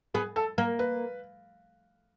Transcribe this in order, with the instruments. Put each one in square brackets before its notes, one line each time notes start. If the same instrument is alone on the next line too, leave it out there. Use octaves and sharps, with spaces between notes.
[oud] B3 [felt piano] G#4
[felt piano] A4
[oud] A#3 [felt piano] A#4
[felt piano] B4